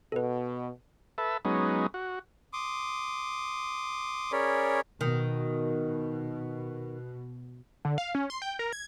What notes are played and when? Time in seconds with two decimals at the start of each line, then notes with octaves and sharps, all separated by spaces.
0.12 B2 A4 B4
1.18 A4 B4 E5
1.45 F#3 G#3 B3 C#4 D#4
1.94 F#4
2.53 C6 D6 D#6
4.32 C#4 G#4 A#4 C#5 D5 B5
5.01 B2 D#3
7.85 D3
7.98 F5
8.15 C#4
8.30 C6
8.42 G5
8.59 A#4
8.73 G#6